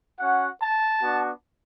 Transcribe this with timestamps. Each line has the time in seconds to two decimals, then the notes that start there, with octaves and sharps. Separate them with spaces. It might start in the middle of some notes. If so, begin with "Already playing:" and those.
0.19 C#4 F#4 F#5
0.61 A5
1.02 B3 D4 F#4